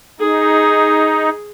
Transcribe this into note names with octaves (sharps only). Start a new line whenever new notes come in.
D#4 G#4